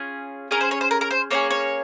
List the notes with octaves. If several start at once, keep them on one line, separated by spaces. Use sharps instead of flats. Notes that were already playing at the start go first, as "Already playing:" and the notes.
Already playing: C#4 F4 G#4
C#4 G#4 A#4
C5
C#5
C5
A#4
A#4
C5
A#3 C#4 G#4 C#5
C#5